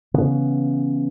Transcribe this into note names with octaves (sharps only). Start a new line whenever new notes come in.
C#3 E3 B3